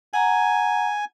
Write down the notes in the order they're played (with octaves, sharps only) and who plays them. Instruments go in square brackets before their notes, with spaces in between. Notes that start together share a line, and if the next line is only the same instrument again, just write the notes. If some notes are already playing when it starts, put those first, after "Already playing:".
[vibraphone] F#5 A#5 [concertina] G#5